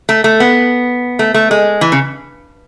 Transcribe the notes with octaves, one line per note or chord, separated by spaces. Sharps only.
A3
A3
B3
A3
A3
G#3
E3
C#3